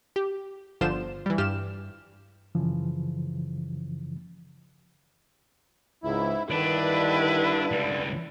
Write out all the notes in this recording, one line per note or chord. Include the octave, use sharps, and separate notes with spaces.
G4
G1 D3 F3 F4 C5 E7
E3 G3
G2 G4 F6 E7
F#2 C#3 E3 F3
C#2 G#2 E4
G2 D3 D#3 D4 E4 B4
C#2 G3